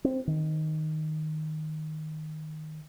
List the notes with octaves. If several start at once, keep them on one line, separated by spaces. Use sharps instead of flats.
C4
D#3